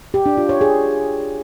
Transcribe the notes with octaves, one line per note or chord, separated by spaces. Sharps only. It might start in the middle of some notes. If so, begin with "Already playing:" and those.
G4
D4
F4
C#5
G#4